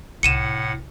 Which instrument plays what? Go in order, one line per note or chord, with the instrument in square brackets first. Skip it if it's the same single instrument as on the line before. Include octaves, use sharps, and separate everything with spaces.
[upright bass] C2 [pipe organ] A2 F#5 [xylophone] C#7 D#7 E7